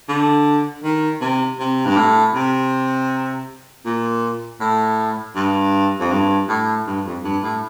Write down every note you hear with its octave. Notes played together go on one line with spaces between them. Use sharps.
D3
D#3
C3
C3
G2
A2
C3
A#2
A2
G2
F2
G2
A2
G2
F2
G2
A2